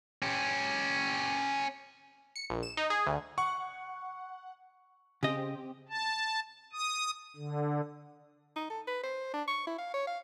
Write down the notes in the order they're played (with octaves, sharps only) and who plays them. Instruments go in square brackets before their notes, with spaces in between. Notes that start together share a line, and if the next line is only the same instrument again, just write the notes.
[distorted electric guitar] C#4 G4
[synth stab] C#7
A#1
E7
D#4
G#4
D2
[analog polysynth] F#5 [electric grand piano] C#6
[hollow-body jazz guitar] C#3 D#5 [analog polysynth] C4 G4
[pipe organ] A5
D#6
D3
[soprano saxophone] D#4
A4
B4
C5
D4
C#6
E4
F5
C#5
F5